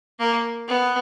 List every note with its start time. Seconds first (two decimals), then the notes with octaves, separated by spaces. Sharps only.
0.20 A#3
0.68 B3